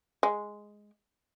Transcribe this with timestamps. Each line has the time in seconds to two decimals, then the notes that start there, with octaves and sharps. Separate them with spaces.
0.23 G#3